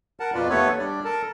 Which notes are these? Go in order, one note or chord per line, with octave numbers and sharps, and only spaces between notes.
A#4 F#5 A5
F2 B2 F4 B4 D5
D#2 A3 B3 A4 B4 C#5
G3 D4 D5
A4 A#4 A5